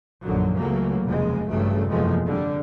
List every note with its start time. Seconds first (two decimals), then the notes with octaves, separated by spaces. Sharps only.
0.22 A#1 F#2 B2 D3 D#3 F#3
0.56 C#2 C#3 E3 F#3 A3 A#3
1.04 F1 D#2 C#3 G#3
1.49 A1 G2 C#3 F#3 A3
1.89 F#1 E2 C3 F3 G#3 A3
2.25 D3 G3